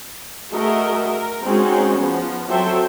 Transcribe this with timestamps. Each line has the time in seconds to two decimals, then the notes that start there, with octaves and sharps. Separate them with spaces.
0.53 A3 F#4 G#4 A#4 D#5 E5
1.06 A#4
1.45 G#3 C4 C#4 D#4 F#4 G#4
1.97 F3 B3
2.49 F#3 C4 A4 C5 E5 G5